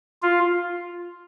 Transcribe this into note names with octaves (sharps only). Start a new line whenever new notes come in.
F4